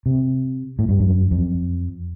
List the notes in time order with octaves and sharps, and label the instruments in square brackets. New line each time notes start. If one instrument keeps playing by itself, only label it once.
[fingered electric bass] C3
A2
G2
F#2
F2